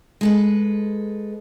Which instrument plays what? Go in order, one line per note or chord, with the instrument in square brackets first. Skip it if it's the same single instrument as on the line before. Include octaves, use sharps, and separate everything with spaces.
[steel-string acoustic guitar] G#3 A4 B4